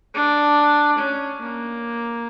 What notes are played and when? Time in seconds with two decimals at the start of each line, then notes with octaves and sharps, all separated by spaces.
0.14 D4
0.98 C#4
1.42 A#3